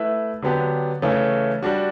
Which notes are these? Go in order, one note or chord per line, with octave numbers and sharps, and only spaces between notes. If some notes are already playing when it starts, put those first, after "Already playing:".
Already playing: A3 E4 B4 E5
D3 F#3 B3 D4 G4
C#3 E3 A3 C#4
G3 D4 F#4